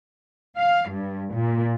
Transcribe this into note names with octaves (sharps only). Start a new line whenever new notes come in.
F5
G2
A#2